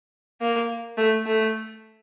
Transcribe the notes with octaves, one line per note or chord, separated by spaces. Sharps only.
A#3
A3
A3